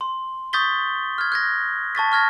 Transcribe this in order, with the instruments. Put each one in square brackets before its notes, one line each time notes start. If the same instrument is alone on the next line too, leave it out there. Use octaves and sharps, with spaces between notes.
[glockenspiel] C6
C#6 D#6 G6 A6 B6 G7
F6 G#6
F#6 G#6 A#6
A5 C#6 A6 B6
C#6 F6 G#6 A#6